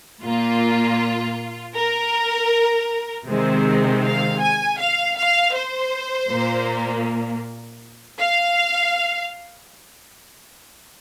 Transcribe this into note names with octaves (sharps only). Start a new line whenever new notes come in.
A#2 A#3 F4
A#4
C3 D#3 G#3 C4
F5
G#5
F5
F5
C5
A#2 A#3
F5